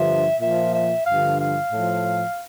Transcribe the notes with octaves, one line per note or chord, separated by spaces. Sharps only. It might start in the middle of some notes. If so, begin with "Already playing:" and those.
Already playing: G2 D3 F3 E5
A#2 F3 E5
E5
G2 D3 F3 F5
F5
A2 F3